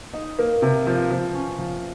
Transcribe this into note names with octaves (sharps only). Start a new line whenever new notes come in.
D#4
A#3
C3
F3
F3
C#4
F3